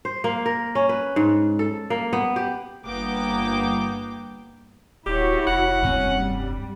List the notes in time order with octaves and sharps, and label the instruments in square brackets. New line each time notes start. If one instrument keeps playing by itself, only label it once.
[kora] C5
A#3
A#4
C#4
B4
G#2
A4
A#3
B3
G4
[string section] G1 A#3 B3 G5 D6
[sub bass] D#1 [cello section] E4 F#4 C#5 [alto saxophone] G4
[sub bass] F1 [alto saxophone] F#5
[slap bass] D2 G2 C4 [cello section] C#4
[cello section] G3